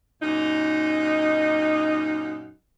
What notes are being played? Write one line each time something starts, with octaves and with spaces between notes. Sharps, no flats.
F#2 A#2 D#4